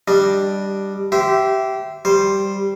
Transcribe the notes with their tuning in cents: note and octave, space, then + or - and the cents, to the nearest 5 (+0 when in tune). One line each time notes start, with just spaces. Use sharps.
G3 +0 D4 +0 D#5 -15
G4 -20 C5 -20 E5 +5
G3 +0 C5 +5